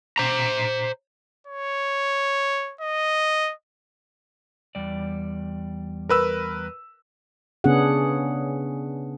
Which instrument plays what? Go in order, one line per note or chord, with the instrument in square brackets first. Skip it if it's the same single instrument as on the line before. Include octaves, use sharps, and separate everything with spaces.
[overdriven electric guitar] C5 A#5
[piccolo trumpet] C#5
D#5
[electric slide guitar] E2 G3 D5
[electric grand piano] A#4 B4 E6
[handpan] C#3 B3 C#4 D4 G#4 F#5